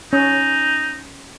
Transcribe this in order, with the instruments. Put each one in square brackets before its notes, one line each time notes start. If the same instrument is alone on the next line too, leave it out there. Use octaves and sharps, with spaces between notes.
[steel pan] C#4 [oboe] D#4